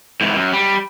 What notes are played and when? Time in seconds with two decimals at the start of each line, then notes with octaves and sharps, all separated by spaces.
0.21 G#2 E3
0.36 F#2
0.53 G3